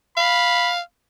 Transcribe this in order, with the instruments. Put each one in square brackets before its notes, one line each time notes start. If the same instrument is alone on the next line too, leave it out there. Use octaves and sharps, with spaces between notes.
[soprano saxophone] F5 [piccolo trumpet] B5